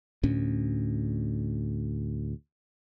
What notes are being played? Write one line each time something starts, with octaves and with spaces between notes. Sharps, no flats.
D2 A2 C#4